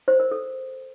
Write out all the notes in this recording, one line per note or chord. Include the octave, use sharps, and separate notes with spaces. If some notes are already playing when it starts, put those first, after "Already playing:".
C5
A#4
A4